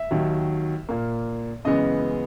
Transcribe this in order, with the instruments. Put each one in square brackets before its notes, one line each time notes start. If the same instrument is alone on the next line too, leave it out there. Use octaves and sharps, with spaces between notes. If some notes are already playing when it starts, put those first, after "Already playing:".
Already playing: [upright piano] E5
D#2 D#3 F#3
A#2 A#3
F#2 C#3 E3 G#3 B3 D#5